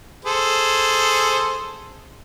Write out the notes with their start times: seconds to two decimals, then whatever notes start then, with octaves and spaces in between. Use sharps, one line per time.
0.25 G#4 A4 C5